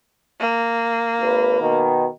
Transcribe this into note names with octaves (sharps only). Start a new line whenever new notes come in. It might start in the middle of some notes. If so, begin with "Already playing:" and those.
A#3
G#1 B4
B2 D#3